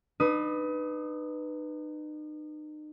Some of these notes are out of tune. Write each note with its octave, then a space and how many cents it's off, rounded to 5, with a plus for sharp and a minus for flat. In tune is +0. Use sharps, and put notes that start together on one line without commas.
D#4 -40 B4 +0 D#6 +30